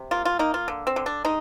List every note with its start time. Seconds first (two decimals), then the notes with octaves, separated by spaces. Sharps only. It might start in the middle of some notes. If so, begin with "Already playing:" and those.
Already playing: C3
0.11 A#3 F4
0.25 F4
0.39 A#3 D#4
0.54 F4
0.68 D3
0.87 C4
0.96 D3
1.06 D4
1.25 G#3 D#4